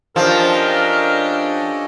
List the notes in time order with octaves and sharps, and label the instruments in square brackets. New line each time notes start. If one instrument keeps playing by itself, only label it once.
[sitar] F3 [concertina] C#4 A4 D#5 [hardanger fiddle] D4 G4 [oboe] A#4